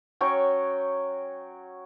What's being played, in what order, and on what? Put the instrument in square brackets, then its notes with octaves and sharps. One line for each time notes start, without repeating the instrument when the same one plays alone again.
[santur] F#3 C#4 G5 C#6